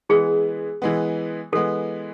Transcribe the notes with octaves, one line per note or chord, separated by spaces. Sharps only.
E3 G#3 B3 G#4
E3 G#3 B3
E3 G#3 B3 A4